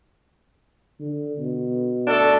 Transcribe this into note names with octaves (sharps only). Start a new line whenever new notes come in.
D3
B2
A3 D4 A4